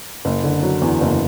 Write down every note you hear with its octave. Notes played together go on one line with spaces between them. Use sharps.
F#1
D3
F#3
E2
F#1